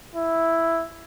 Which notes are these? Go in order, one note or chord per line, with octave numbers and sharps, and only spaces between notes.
E4